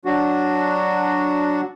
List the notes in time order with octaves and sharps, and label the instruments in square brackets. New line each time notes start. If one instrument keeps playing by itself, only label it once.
[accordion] F#3 D4 F#4